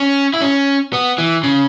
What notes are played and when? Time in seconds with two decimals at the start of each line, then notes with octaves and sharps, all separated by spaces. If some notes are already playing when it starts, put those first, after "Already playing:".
Already playing: C#4
0.34 E4
0.41 C#4
0.93 B3
1.18 E3
1.43 C#3